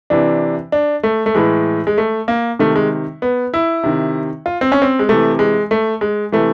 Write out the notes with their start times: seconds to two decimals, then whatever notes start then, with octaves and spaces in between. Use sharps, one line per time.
0.10 C3 E3 D4
0.72 D4
1.03 A3
1.26 A3
1.35 A2 E3 G#3
1.87 G#3
1.98 A3
2.28 A#3
2.59 C3 D#3 A3
2.76 G#3
3.22 B3
3.54 E4
3.83 C3 D#3
4.46 F4
4.61 C4
4.72 C#4
4.82 C4
4.99 G#3
5.09 C3 E3 A3
5.39 G#3
5.71 A3
6.01 G#3
6.32 C3 E3 A3